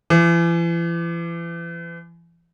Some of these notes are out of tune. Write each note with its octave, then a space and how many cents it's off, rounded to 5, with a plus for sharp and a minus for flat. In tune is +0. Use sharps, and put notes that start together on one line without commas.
E3 +40